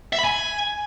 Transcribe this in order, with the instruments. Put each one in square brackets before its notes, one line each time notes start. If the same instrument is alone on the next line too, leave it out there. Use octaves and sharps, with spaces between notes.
[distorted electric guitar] E5
B5
G#5